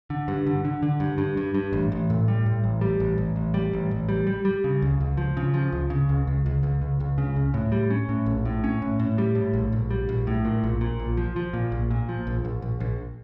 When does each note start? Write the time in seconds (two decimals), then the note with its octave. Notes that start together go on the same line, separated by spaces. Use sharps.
0.10 D3
0.28 G2
0.47 D3
0.65 D3
0.83 D3
1.00 G2
1.18 G2
1.37 G2
1.54 G2
1.73 A1
1.92 A1
2.10 A2
2.28 G3
2.46 A2
2.64 A1
2.81 G3
3.00 A1
3.18 A1
3.36 A1
3.54 G3
3.73 A1
3.91 A1
4.09 G3
4.27 G3
4.45 G3
4.64 C#3
4.82 C#2
5.01 C#2
5.17 F3
5.37 C#3
5.54 F3
5.72 C#2
5.90 C#3
6.09 C#2
6.27 C#2
6.46 C#2
6.63 C#2
6.82 C#2
7.00 C#2
7.18 C#3
7.36 C#2
7.54 A2
7.72 G3
7.91 C#4
8.09 A2
8.26 A#1
8.45 A2
8.64 C#4
8.82 A2
8.99 A2
9.18 G3
9.35 A2
9.54 A#1
9.72 A#1
9.91 G3
10.09 A#1
10.27 A2
10.45 A#2
10.63 A#1
10.81 A#2
11.00 A#1
11.17 F3
11.36 F3
11.53 A#2
11.72 A#1
11.91 A#2
12.09 F3
12.27 A#1
12.45 A#1
12.62 A#1
12.80 A#1